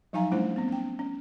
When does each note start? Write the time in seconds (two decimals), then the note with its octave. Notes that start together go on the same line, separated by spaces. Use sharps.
0.13 F3 F#3 D#4 F5 G#5 A#5
0.32 G3 A3 C#4 D4 E4 C5
0.56 B3 C4
0.68 C#4 G5
0.99 C#4